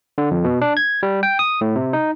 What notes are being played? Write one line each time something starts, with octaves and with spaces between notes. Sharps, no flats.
D3
F2
B2
D4
G#6
G3
G5
D#6
A2
C3
D#4